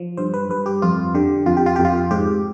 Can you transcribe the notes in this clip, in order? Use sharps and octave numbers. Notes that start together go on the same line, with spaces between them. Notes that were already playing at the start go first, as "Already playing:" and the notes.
Already playing: F3
G2 C5
B4
G2 B4
G4
F2 F4
D3 G4
F2 F4
G4
F4
F2 G4
F4
G#2 G4